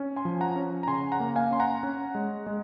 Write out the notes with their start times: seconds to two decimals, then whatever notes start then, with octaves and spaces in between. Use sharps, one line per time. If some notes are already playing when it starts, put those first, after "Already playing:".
Already playing: C#4
0.16 G#5 C6
0.25 F3
0.41 F#5 A#5
0.56 C#4
0.83 A#5
0.87 C#3 G#5 C6
1.12 F#5 A#5
1.20 A#3
1.36 F5 G#5
1.51 C#4 C6
1.60 F#5 A#5
1.83 C#4
2.15 G#3
2.47 G#3